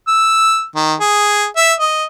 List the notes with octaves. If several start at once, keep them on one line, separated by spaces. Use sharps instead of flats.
E6
D#3
G#4
E5
D#5